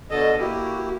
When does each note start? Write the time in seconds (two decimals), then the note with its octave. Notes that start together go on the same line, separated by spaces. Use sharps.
0.11 B2 D3 A4 D#5
0.39 A#3 E4 F#4 G4